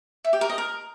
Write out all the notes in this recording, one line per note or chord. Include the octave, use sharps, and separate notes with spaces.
E5
G4
A#4
D#5
A#4